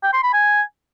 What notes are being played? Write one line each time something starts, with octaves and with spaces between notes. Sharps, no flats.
G5
C6
B5
G#5